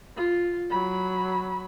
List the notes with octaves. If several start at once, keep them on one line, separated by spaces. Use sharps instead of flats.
F4
F#3 B5